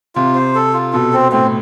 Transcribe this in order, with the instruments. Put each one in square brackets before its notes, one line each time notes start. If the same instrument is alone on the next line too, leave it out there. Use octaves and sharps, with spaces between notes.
[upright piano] C3 [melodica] F4
[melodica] C5
A4
F4
[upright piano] B2 [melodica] A4
[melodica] C4
[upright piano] A2 [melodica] C4